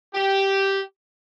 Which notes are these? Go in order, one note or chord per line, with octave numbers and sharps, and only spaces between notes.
G4